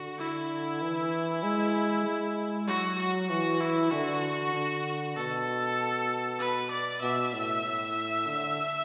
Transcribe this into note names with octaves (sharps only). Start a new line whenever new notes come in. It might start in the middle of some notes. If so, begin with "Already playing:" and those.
Already playing: D3 F#4
E4
E3
G#3
G#3
F#3 F#4
F#4
E3 F#4
E4
D3 F#4
D3
B2 A4
B4
D5
B2 E5
A2
A2
D3